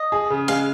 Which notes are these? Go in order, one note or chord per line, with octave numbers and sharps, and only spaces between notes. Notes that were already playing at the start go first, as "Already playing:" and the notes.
Already playing: D#5
G#4
C#3
G#3 F5